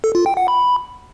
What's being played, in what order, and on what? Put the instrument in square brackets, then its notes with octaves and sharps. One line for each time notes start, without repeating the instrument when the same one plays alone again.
[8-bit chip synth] A4
F4
G5
F#5
B5